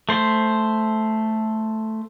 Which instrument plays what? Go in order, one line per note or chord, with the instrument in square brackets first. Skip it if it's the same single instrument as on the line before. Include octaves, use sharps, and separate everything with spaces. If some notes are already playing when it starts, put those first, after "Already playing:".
[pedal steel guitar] A3 C5